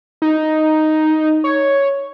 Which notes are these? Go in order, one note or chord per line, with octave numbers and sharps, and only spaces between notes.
D#4
C#5